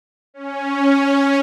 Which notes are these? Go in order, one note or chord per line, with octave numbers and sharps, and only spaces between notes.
C#4